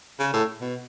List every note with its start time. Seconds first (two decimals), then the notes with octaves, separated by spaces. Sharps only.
0.19 C#3
0.33 A2
0.61 B2